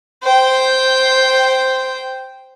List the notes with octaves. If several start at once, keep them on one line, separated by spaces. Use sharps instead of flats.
C5 G5